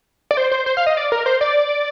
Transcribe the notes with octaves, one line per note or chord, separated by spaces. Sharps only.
D5
C5
C5
C5
F5
D#5
D5
A#4
C5
D5